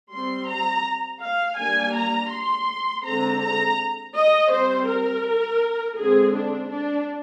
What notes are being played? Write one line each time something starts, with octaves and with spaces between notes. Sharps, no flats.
G3 C4 C6
A#5
F5
G3 A#3 D4 G#5
A#5
C6
D3 G#3 C4 A#5
A#5
D#5
G3 C4 C5
A#4
D3 G#3 C4 G#4
D4
D4